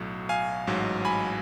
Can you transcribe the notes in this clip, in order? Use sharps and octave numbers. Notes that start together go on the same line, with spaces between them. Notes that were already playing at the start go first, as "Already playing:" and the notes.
Already playing: B1 A2 F#3
F5 G#5
A1 G#2 F#3
G#5 B5